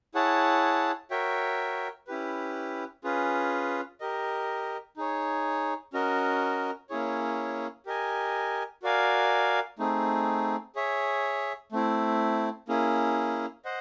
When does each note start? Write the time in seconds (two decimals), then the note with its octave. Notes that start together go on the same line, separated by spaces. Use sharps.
0.15 E4 G#4 C#5 F#5 A5
1.11 F#4 A#4 C#5 E5 G5
2.07 C#4 E4 G4 B4
3.04 C#4 F4 G#4 B4
4.00 G4 A#4 D#5
4.97 D#4 G#4 C#5
5.93 C#4 F#4 A#4 D#5
6.90 A#3 C#4 E4 G#4 C#5
7.86 G4 A#4 D#5 G#5
8.83 F#4 A#4 D5 F5 G#5
9.79 A3 C4 D#4 G#4
10.76 G#4 C#5 E5
11.72 A3 C4 E4
12.68 A#3 C#4 E4 G#4
13.65 C5 D#5 F#5